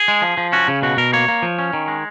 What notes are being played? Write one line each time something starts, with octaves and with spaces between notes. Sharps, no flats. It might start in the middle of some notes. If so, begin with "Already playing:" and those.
Already playing: G#4
G#3
F3
F3
C#4 F#4
C#3
B2 F#4
B2 A#4
A#3 C#5
A#3
F3
C#4
D#3
G#3